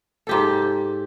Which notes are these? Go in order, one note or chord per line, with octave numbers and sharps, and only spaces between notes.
G#2 G4 A4